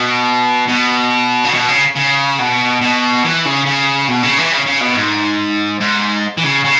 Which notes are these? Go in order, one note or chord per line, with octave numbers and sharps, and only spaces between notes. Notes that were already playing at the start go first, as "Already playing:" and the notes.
Already playing: B2
B2
C#3
B2
C#3
C#3
B2
B2
E3
C#3
C#3
B2
C#3
E3
C#3
C#3
B2
G#2
G#2
E3
C#3
C#3